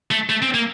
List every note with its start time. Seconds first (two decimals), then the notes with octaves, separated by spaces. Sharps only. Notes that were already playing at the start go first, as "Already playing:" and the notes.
0.11 A3
0.29 A3
0.42 C4
0.54 A#3